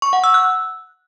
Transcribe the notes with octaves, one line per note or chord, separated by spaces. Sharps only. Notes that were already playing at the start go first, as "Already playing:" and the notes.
C#6
F#5
E6
F#6